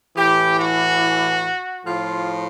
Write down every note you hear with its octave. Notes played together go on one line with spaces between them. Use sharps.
A2 E3 G4
F#4
A2 F3 F4